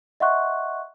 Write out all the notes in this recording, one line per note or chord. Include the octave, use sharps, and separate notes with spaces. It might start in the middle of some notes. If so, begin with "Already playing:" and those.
D#5 E5 F#5 C6 C#6 F#6